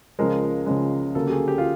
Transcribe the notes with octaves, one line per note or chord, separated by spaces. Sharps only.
C#2 C#3 F3 G#3 A#4
C#2 C#3 F3 G#3
D2 C#3 F#3 A#3 A4
G4
G#4
G4
F4